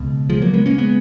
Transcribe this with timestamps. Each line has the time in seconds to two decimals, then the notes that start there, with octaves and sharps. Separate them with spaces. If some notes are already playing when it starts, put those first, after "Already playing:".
Already playing: C#2 B2
0.30 F3 G#3
0.42 F#3 A#3
0.53 G#3 B3
0.66 A#3 C#4
0.78 G#3 B3